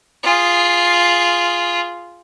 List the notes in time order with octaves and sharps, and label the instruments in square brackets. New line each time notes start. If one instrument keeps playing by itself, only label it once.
[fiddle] F4 G#4